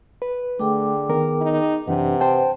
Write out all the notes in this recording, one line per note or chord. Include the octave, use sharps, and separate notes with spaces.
B4
D3 A3 G#4 G5 D6
D#3 B3 A#4
D#4
F#2 C3 E3 D4 B4 F#5
C5 G5 A5